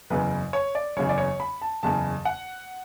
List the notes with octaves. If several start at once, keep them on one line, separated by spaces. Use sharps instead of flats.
F#1 E2 C#3 B4
C#5
D5
F#1 E2 C#3 C#5
D5
C#5
B5
A5
F#1 E2 C#3 A5
F#5